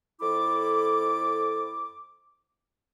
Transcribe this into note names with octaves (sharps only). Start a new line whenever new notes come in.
F2 E4 A4 D6